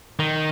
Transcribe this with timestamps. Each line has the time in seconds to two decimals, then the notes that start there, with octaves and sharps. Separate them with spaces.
0.19 D#3